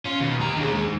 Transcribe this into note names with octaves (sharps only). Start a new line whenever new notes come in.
C#4 F4
D#2 B2
A#3 G4 A#5
D#2 D4 G#4
G#3 D#4